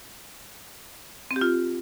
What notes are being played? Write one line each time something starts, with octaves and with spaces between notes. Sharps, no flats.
C4
G4
F4